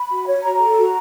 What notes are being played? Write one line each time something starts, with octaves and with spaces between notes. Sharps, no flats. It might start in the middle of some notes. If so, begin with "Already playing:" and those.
Already playing: B5
F#4
C#5
F#4 A#5
A4
F#4